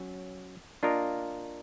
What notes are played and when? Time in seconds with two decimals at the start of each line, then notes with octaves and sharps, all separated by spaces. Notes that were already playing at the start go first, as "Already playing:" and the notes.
Already playing: F#3 C#4
0.83 A#3 D4 F4 A#4 D#5